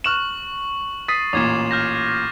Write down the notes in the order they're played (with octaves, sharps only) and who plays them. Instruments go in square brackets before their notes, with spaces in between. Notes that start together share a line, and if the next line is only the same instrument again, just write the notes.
[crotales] C#6 F#7 [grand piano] F6 F#6 E7
[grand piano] D#6 B6 [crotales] A6 C7 D#7
[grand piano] A1 A#2 [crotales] D6 G#6 E7
[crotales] F6 G6 A#6